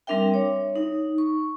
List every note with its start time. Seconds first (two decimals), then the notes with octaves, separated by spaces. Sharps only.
0.07 G3 C4 D4 A#4 E5 G5
0.34 C#5
0.76 D#4
1.18 C#6